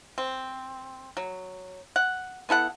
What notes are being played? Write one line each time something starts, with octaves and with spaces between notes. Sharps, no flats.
C4
F#3
F#5
B3 E4 A4 F#5